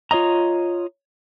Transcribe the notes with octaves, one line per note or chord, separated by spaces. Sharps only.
F4 C#5 D#5 A#5